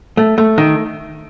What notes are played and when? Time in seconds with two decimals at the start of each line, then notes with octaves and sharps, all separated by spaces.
0.17 A3
0.38 A3
0.58 D#3